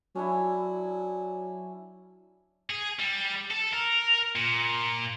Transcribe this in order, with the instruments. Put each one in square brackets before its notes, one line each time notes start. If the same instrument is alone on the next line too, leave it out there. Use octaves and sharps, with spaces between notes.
[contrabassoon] F#3 [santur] C#4 D4 E4
[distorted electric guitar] G#4
G3
A4
A#4
A#2